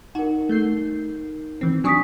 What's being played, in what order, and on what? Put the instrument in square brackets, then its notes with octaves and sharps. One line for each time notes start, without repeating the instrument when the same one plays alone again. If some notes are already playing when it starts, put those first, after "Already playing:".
[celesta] D#4 A#4 [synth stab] F#4
[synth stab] A3 G6 C7
E3 C4
[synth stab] F#3 D4 C#6 [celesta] G#5 D#6 B6